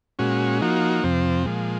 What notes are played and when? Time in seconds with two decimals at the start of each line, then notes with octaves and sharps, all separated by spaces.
0.19 A#2 G#3 C#4 F#4
0.61 F3 A#3 D#4 F#4
1.04 F2 C3 F3 C4
1.45 A#2 F3 G#3